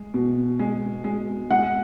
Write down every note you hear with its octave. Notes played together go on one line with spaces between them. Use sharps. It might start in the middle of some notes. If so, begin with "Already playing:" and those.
Already playing: G#3
B2
G#3
G#3
G#3 F#5